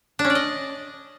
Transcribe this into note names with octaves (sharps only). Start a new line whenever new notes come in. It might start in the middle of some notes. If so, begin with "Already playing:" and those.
D4
C#4
D5
D#5